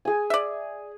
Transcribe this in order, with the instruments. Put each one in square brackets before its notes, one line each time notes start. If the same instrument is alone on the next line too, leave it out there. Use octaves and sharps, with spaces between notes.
[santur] G#4 G#5
[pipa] D5 E5